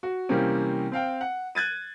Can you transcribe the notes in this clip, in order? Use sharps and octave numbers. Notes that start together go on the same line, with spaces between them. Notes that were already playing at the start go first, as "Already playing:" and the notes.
F#4
C3 E3 G3 A#3 C4 C#4
C4 F5 G5
F#5
F#6 G#6 A6 D#7